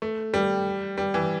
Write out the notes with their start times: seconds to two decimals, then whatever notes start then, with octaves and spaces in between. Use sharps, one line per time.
0.02 A3
0.34 G3
0.98 G3
1.14 E3